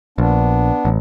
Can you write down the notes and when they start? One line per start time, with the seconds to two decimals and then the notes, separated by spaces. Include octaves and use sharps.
0.18 A#1 B3 D4
0.85 A1